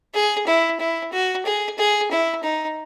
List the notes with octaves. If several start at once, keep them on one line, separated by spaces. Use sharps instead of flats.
G#4
E4
E4
F#4
G#4
G#4
E4
D#4